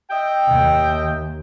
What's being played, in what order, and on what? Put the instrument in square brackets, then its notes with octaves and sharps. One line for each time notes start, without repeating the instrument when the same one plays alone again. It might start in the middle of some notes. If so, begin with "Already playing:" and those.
[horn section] D#5 E5 G5
[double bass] D#2